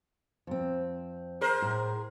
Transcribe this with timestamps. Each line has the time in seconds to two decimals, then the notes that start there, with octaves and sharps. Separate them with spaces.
0.47 F2 C4
1.41 G#4 A#4 C5
1.62 A2